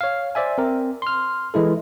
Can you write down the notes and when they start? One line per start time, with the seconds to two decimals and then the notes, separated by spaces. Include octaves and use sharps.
0.01 C#5 F5
0.35 C5 D5 E5 G#5
0.58 C4 A#4
1.02 C6 F6
1.54 E3 G#3 E4 A4